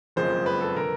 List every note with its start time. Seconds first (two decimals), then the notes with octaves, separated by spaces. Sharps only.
0.16 F#1 F2 C#3 F3 G#3 C5
0.46 B4
0.61 A4
0.76 D3 A#4